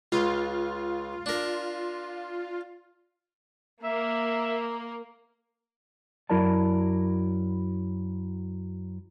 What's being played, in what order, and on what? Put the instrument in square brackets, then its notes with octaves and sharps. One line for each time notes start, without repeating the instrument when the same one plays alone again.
[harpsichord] C#2 [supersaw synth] F4
[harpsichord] D4 A#4
[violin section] A#3 [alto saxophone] E5
[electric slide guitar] F#2 F#3 E4 A#4 D5 A5